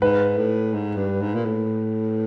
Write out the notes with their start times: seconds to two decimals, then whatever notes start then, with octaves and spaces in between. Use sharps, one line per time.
0.01 G#2 B4
0.38 A2
0.74 G#2
0.97 G2
1.22 G#2
1.35 A#2
1.45 A2